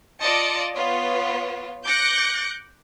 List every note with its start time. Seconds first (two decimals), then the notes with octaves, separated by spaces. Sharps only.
0.21 F4 D5 D#5 A5 C#7
0.74 B3 F4 C#5
1.87 D6 F#6 G6 A#6 C#7